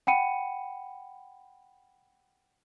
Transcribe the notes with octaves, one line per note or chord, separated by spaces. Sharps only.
F#5 G5 B5 C#7 D#7